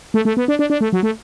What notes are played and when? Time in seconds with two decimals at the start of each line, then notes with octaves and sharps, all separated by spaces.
0.14 A3
0.25 A3
0.37 B3
0.48 D4
0.59 D4
0.70 D4
0.81 A3
0.93 F#3
1.03 A3